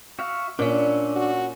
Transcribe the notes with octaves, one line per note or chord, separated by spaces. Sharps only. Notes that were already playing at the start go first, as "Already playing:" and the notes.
F#4 E5 F5
A#2 C#4 D4 E5
F#4